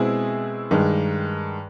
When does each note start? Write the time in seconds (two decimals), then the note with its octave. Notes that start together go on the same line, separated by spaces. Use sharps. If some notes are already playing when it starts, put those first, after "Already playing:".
Already playing: B2 G#3 C4 E4 G#4
0.71 G2 D#3 G#3